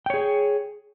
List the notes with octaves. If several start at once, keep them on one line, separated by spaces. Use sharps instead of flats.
G#4 C#5 G5